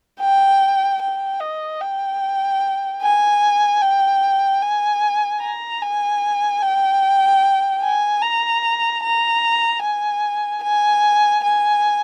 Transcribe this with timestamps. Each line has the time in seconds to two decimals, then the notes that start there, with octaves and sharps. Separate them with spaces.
0.20 G5
1.01 G5
1.40 D#5
1.81 G5
3.02 G#5
3.82 G5
4.62 G#5
5.41 A#5
5.81 G#5
6.62 G5
7.82 G#5
8.22 A#5
9.03 A#5
9.82 G#5
10.63 G#5
11.43 G#5